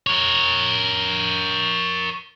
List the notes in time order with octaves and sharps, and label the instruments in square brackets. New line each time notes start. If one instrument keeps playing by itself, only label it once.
[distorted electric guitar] A#4 C#5